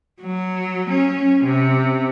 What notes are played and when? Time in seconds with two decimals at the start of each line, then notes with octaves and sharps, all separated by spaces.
0.21 F#3
0.90 C#4
1.43 C3